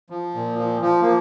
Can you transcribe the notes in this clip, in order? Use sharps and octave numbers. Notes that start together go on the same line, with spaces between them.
F3
A#2
F3
F3
F3 A#3